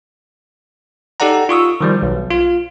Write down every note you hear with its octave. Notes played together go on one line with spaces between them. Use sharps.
D#4 G4 A4 D5 F#5 A#5
F4 C#6 D#6 E6
D#3 F3 G3
B1
F4